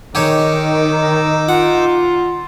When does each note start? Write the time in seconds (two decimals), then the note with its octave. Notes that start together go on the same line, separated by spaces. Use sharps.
0.15 D#3 D#4 G4 G#4 C#5 D6 E6
1.49 F4 F#5